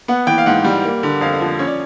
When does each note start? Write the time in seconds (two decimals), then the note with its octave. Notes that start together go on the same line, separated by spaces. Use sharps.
0.08 B3 F#5
0.27 E3 G5
0.38 F5
0.46 G#2 F#5
0.65 G3
0.84 A#3
1.03 D3
1.21 F2 F5
1.41 F3
1.59 C#4 C#5
1.67 D5